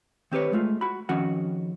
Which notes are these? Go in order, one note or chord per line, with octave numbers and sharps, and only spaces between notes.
D#3 C4 G4 B4 C#5
G#3 A3 F4
F#4 B5
F2 D#3 C#4 F#4 F#5